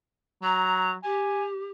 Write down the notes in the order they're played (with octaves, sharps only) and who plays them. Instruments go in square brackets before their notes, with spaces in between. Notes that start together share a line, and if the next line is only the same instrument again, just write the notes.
[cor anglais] F#3 [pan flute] A#5
[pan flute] G4 [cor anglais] G#5